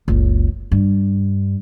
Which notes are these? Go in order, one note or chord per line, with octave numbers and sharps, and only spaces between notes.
F#1 C#2
G2